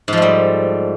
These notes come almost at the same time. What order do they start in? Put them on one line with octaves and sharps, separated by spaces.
G#2 F3 A3 G3